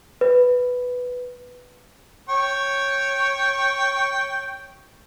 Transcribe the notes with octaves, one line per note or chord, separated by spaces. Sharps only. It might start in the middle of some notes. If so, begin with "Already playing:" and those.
B4
C#5 G5 C#6